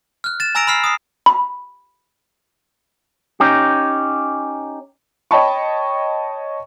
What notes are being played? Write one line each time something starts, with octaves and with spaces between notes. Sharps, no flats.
F6 F#6
A6 E7
G#5 A#5 E6 A#6 D7 F7
B5 E6 F6 C7
D#6 C7
B5
C#4 D#4 G4
C#5 D#5 G5 A5 B5 C#6